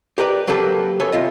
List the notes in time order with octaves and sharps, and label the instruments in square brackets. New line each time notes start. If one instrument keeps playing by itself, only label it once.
[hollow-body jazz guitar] G4 A#4 B4 D5
F#3 A#3 G4 A4 B4
F#2 B3 A4 C#5 G#5
D#2 C3 F4 D#5